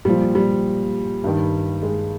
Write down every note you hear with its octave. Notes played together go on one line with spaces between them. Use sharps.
A#2 F3 G3
G3
G2 D#3
G#3